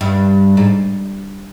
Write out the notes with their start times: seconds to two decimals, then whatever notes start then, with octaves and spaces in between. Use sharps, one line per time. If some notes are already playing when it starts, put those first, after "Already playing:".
0.01 G2
0.57 G#2